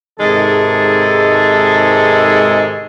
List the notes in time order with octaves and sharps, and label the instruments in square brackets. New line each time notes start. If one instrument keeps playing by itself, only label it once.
[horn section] G#2 C3 D#3 G#3 A4